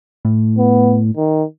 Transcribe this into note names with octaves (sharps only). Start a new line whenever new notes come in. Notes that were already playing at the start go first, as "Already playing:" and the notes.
A2
B3
D#3